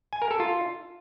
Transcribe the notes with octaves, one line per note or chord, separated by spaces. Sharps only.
G#5
A#4
A4
F4